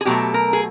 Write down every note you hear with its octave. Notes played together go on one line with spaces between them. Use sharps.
G#4
B2 F#3 A3 G4
A#4
G#4